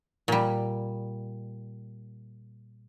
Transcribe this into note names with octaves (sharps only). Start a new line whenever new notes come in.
A#2 G3